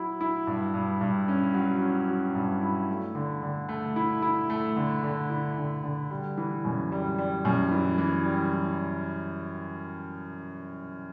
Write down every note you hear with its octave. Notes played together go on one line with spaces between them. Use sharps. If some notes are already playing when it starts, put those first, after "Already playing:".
Already playing: F#3 E4
E4
G2
G2
G2
C#4
F#3
C#4
F#3
G2
E4
A3
D3
D3
A3
E4
E4
A3
D3
D3
E4
D3
D3
G3
E3
F#2
G3
G3
F#2
E3
E3
G3
E3